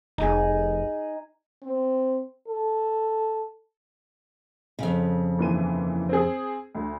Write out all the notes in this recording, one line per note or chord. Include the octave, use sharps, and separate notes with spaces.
F1 D#4 G#4
C4
A4
F2 C#3
D#2 E3 D#7
C4 G#4
D2